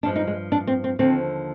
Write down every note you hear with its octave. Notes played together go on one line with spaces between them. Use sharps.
G2 F3 G#3 D4
D#4
G#3
D4
C4
C4
D#2 D3 F3 C4